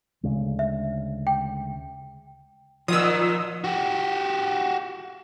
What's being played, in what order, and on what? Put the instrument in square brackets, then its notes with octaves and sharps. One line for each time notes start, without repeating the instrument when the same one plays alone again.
[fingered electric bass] D2 C#3 G#3
[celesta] E5
G5
[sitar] A#2 D#3 F#3 [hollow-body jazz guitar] F3 [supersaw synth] D#6 E6
[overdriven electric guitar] F#4 G4